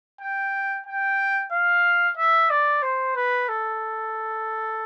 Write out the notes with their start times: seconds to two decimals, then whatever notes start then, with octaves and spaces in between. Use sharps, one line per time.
0.21 G5
0.86 G5
1.52 F5
2.17 E5
2.50 D5
2.82 C5
3.16 B4
3.48 A4